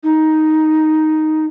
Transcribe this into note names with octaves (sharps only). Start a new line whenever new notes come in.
D#4